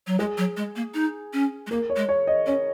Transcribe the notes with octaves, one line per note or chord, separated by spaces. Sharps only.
F#3
G#3 G#4
F#3
G#3
A#3
D#4
C#4
G#3
A#3 A#4
C#5
G#3
C#5
D#5
C#4 C#5